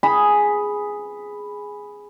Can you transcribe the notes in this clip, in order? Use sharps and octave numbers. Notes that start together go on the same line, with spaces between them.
G#4 B5